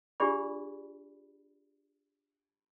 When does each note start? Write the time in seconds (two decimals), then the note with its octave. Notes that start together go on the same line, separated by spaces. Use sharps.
0.20 D4 F4 G4 G#4 D5 B5